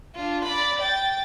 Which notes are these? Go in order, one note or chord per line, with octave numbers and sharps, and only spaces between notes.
D4 F4
D5 B5
G5 A6